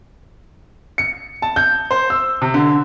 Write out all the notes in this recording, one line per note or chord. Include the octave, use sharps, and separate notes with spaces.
C#7
A5
G6
C5
E6
C3
D3